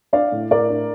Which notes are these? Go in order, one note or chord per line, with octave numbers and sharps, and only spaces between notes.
D4 D5 F5
A2
A2 A#4 D5
D4